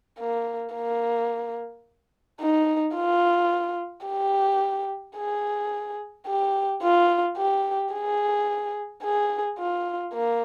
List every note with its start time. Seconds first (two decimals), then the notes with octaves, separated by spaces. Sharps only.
0.19 A#3
0.75 A#3
2.41 D#4
2.96 F4
4.06 G4
5.17 G#4
6.27 G4
6.83 F4
7.37 G4
7.94 G#4
9.03 G#4
9.59 F4
10.14 A#3